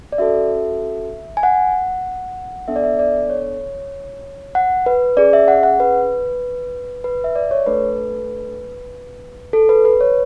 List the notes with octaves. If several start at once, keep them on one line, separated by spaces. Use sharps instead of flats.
D5
C#4 F#4 A4 E5
G#5
F#5
B3 D4 A4 E5
D5
E5
D5
C#5
F#5
B4
C#4 G#4 D5
E5
F#5
F#5
B4
B4
E5
D5
C#5
A3 D4 A4 B4
A4
B4
B4
C#5